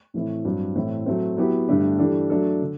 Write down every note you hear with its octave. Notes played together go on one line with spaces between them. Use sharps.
A2 E3 A3 C4 E4
G2 F#3 C4 G4
A2 E3 A3 C4 E4
F#3 A3 C4
F#3 B3 E4 G4
G2 D3 A3 D4 G4
E3 G3 D4 A4
F#3 A3 D4 A4
D3